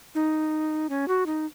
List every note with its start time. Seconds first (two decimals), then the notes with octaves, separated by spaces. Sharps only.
0.15 D#4
0.89 C#4
1.08 F#4
1.26 D#4